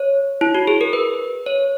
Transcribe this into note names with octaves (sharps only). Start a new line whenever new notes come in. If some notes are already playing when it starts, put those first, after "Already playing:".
Already playing: C#5
E4
F#4
G#4
A#4
B4
C#5